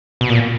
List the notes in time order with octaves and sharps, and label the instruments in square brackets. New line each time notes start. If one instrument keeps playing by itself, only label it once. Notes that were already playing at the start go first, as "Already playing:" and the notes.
[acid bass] B2
A#2